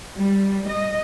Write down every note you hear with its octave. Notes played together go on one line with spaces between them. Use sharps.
G3
D#5